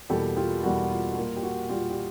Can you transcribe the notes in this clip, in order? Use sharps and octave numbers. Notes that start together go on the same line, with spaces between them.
E2 B2 G3 A#3 G4 A4
F4 G4
E2 B2 G3 A#3 F#4
F4
F#4
A#2 G3 A#3 F4
G4
F#4
A#2 G3 A#3 F4 G4
G4